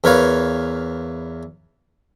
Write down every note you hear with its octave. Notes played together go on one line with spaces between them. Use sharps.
E2 A#4 B4 C#5 F5